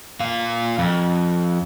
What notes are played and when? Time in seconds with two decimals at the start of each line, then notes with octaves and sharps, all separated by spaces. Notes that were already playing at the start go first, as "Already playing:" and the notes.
0.20 A#2 F5
0.78 F2